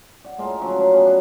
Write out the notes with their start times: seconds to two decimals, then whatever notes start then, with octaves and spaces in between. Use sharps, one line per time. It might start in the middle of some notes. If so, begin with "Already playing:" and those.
0.24 D5 F#5
0.38 A2 G#3 A#3 F4
0.61 D3 F3 F#3 C#4
0.76 C#4 D4
0.93 B3 C#4
1.06 D4